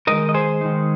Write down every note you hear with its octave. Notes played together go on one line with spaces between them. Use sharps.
D#3 G#3 D#4 A#4 D#5
D#5
G#4 C5
D#3 G#3 D#4